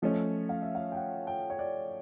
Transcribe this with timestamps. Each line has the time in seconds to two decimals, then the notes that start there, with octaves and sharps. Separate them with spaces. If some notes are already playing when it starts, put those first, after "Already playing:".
0.02 F3 A3 C#4 D#5
0.49 F5
0.62 E5
0.75 F5
0.92 G5
0.96 F#5
1.27 G5
1.50 C#5
1.59 D5